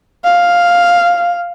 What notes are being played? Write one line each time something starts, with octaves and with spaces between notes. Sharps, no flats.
F5